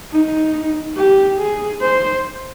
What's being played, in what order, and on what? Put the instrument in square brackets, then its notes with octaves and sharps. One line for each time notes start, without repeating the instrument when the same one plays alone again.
[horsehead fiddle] D#4
G4
G#4
C5